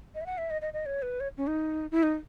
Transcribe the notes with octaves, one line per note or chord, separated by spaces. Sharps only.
D#5
E5
F#5
E5
D#5
D#5
D#5
C#5
B4
C#5
C#4
D#4
E4
D#4